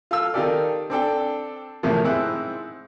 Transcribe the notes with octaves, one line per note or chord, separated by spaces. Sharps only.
F4 A4 E6 F6
D#3 D#4 F4 G4 A4 D5
C4 D4 A4 G5
E2 A2 C3 D#3 F3
G#2 C4 E4 F#6